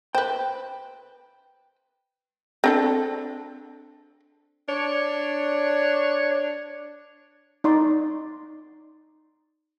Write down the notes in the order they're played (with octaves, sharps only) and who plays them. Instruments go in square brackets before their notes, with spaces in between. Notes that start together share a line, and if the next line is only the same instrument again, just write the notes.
[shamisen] B4 C5 [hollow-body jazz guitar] G5
[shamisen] C4 D4 A4
[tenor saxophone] D4 [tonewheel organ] C#5
[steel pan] D#4 D5 C6